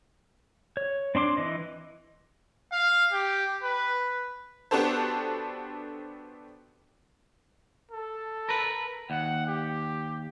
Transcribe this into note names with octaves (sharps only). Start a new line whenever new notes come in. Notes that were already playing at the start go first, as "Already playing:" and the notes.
C#5
C4 D4 C6 D6
E3 D#5
F5
G4
B4
B3 D4 F#4 G4 A4 C5
A4
A#4 B4
D#2 F#5
G4